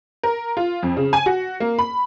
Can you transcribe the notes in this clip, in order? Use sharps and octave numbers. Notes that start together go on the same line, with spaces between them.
A#4
F4
F2
C#3
G#5
F#4
A#3
B5